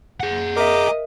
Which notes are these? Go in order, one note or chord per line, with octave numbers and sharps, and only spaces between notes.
G#4 F#5
A#4 D#5 E5 A#5 D6